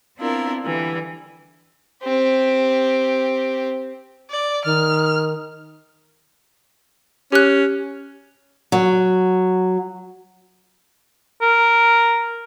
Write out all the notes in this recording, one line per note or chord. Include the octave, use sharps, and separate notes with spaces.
B3 C4 D4 E4 F4 A#4
D3 E3 G3
C4 G4
D5
D#3 F6
C#4 G4 F#6
F#3
A#4